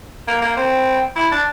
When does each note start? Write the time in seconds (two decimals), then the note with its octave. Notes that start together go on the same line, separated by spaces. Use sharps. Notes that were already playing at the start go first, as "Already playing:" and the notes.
0.28 A#3
0.42 A#3
0.57 C4
1.16 E4
1.32 D4